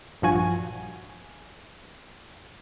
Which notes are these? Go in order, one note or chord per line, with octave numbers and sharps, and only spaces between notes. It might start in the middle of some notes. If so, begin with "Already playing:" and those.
A#1 G2 F3 F#4 G#5